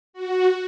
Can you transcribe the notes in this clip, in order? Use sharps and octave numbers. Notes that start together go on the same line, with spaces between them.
F#4